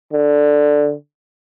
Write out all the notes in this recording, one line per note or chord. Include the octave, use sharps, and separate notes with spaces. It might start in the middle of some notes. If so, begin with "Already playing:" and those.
D3